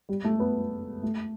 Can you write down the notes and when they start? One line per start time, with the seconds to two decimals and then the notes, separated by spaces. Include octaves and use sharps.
0.09 G3
0.24 A3
0.40 B3
1.03 A3